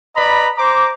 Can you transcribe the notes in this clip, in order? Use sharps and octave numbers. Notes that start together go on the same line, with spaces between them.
B4 D5 D#5 A#5 B5
C5 A#5 D6